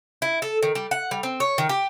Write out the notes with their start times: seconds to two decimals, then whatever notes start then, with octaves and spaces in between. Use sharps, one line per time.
0.22 E4
0.42 A4
0.63 D#3
0.75 G3
0.91 F#5
1.11 G3
1.23 C4
1.40 C#5
1.58 D#3
1.69 G4